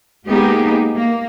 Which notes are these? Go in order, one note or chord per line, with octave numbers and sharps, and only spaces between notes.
G#3 A#3 B3 D#4 G4 G#4
A#3